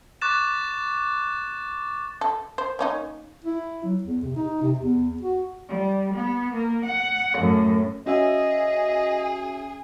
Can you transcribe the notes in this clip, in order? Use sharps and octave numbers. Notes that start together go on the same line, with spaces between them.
C#6 D6 F#6 A6 E7
A4
C5
A#3 C#4 D#4
E4
F#3
E2
C3
D#4
C3
E2
F#4
G3
B3
A#3
F#5
F#2 A2
C#4 F#4 G#4 D#5 E5